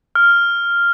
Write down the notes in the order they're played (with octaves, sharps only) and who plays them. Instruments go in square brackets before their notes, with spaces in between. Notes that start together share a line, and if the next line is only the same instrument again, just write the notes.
[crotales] F6